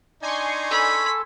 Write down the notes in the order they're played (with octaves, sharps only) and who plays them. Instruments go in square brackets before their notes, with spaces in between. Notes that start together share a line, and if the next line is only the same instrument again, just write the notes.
[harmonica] D4 D#4 [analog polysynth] G#5 C6 C#6
[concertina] A4 [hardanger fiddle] B5